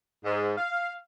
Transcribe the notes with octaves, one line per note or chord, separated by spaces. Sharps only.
G#2
F5